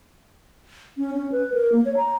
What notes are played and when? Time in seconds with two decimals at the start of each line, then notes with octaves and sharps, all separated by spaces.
0.98 C#4
1.14 C#4
1.32 B4
1.54 A#4
1.72 A#3
1.85 C#5
1.97 A#5